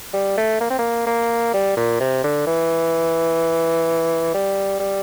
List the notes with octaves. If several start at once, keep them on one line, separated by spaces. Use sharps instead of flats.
G3
A3
A#3
C4
A#3
A#3
G3
A#2
C3
D3
E3
G3
G3